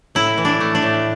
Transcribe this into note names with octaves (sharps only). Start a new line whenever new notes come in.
A2 E4
E3
D4
A3
D4
A2